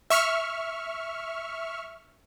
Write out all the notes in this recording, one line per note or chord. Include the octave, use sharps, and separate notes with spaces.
E5 C#6 F6